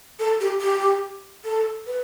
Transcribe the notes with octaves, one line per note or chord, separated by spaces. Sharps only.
A4
G4
G4
A4
B4